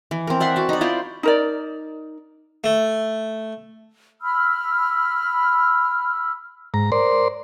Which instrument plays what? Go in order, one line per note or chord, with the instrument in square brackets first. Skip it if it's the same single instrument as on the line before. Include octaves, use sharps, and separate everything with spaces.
[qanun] E3
C4 A#4
D5 E5 F#5 C6
F#4 A5
D#4 D5
E4 F4 C5
[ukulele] D#4 A#4 D5
[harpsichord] A3
[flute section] B5 E6 F6
[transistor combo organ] G#2 A#5
A#4 C5 D5 C6